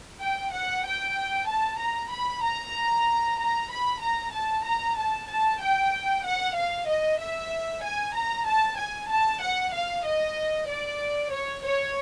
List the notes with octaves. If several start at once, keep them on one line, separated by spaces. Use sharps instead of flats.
G5
F#5
G5
A5
A#5
B5
A#5
A#5
B5
A#5
A5
A#5
A5
A5
G5
F#5
F5
D#5
E5
G#5
A#5
A5
G#5
A5
F#5
F5
D#5
D5
C#5
C#5